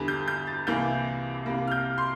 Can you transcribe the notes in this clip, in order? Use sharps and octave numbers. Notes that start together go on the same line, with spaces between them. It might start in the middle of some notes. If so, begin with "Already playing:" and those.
Already playing: E2 D3 G3
G6
G6
A6
C2 C3 E3 A#3 G6
C2 C3 G3 A#3
F6
G6
C6